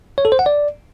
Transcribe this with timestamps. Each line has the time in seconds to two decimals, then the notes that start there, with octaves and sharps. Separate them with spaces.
0.18 C#5
0.25 A4
0.32 C5
0.39 F#5
0.46 D5